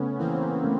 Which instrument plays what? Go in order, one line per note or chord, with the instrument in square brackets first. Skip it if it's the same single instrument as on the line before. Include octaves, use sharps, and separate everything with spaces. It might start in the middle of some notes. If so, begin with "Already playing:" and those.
Already playing: [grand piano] C#3 A3 [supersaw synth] B3 C#4
[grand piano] E3 [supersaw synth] A#3 C4
[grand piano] A3